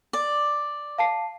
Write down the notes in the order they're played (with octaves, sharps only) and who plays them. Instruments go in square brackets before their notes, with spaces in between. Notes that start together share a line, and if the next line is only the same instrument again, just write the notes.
[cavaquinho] D5
[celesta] F5 A5 C7